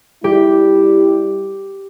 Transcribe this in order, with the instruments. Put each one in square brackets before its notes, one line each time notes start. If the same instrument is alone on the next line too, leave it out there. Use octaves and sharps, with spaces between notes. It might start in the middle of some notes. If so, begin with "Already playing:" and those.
[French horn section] G3 E4 [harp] G4